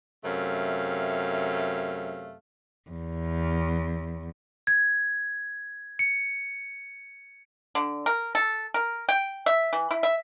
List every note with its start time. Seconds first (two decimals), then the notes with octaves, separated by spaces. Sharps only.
0.25 F#2 C3 A3 F5
2.90 E2
4.67 G#6
5.99 C#7
7.75 D3
8.06 A#4
8.35 A4
8.74 A#4
9.09 G5
9.46 E5
9.73 E3
9.91 E4
10.03 E5